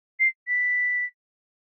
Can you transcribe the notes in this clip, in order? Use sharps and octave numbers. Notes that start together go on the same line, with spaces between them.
C7
B6